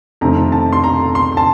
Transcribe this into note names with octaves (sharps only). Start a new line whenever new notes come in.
F2 C3 D#3 A3 C4 A#5
A5
C6
A#5
C6
A5